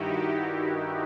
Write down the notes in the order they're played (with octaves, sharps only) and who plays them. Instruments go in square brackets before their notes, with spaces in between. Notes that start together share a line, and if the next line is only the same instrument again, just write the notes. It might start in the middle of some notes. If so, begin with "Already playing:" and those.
Already playing: [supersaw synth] G2 D#3 D#4 E4 F#4 G4